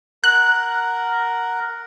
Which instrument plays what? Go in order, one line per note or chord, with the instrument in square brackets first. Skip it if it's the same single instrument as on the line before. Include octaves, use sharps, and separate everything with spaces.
[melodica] A#4 F#5 [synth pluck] F#6